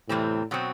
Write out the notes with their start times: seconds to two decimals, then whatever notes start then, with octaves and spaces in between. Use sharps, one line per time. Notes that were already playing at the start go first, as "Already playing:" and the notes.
0.09 E2 A2 C3 E3 G3 C4
0.51 B2 F#3 C4